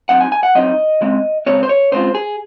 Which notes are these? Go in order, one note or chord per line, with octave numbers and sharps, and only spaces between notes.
F#3 C4 D#4 F#5
G#5
G#5
F#5
F#3 C4 D#4 D#5
C#3 G#3 C4
C#3 G#3 C4 C#5
C5
C#5
C#3 G#3 C4 F4 C5
G#4